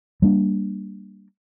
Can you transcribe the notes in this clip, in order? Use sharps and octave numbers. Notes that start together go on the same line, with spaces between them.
G3 A#3 D4